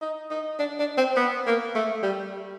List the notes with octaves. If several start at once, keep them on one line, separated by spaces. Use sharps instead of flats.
D#4
D#4
D4
D4
C4
B3
A#3
A3
G3